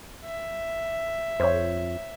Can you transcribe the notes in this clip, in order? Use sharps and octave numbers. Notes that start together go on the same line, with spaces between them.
E5
F2 C5 C#5